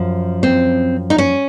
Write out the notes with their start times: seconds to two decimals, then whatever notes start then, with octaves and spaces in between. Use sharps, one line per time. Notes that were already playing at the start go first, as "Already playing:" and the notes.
Already playing: F#2 F3
0.43 C4
1.10 D#4
1.18 C#4